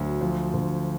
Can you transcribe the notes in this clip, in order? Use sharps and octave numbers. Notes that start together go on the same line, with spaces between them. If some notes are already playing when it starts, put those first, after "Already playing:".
Already playing: D2 F#3
F3
D2